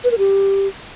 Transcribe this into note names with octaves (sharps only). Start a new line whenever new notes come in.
B4
A#4
G4